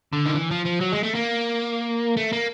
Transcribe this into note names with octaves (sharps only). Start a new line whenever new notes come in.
D3
D#3
E3
F3
F3
F#3
G#3
A3
A#3
A3
A#3